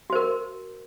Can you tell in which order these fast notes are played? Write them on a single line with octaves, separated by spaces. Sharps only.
F#4 C5 A#4